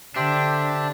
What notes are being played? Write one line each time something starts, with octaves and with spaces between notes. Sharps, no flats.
D3 D4 G4 C5 E5